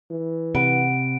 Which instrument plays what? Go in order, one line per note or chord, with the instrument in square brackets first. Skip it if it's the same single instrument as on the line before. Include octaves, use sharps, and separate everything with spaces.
[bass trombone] E3
[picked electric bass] C3 [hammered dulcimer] F#5 B5 [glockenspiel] D7